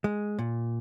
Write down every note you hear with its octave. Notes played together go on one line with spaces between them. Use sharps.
G#3
A#2